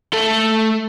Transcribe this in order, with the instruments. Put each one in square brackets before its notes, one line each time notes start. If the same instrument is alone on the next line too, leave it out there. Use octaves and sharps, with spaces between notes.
[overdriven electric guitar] A3 A4